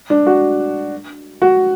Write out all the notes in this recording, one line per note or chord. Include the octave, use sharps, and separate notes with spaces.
D4
F#4
F#4